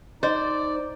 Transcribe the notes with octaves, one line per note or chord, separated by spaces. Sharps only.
D#4 C5 D5 D#5